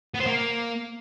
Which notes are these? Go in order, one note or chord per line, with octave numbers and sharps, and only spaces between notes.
B3
C5
A#3